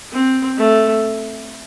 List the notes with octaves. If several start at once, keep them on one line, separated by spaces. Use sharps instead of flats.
C4
A3